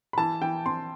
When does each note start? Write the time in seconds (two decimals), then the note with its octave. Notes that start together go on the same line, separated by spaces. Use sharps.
0.13 B5
0.18 E3 A5
0.42 E3 G5
0.66 C4 C6